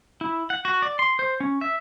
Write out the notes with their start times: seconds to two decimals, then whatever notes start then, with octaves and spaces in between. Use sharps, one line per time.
0.21 E4
0.50 F#5
0.65 F#4
0.82 D5
0.99 C6
1.19 C5
1.40 C#4
1.61 E5